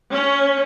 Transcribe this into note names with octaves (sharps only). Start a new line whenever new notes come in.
C#4